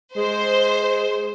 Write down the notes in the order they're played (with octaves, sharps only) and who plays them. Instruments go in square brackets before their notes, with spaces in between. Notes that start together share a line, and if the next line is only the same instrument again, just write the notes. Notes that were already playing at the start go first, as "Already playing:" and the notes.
[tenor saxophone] G#3 [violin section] C5